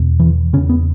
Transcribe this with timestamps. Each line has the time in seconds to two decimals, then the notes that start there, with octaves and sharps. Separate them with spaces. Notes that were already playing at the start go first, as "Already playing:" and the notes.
Already playing: E2 B2
0.20 E3
0.53 E2 C#3 C#4
0.70 B3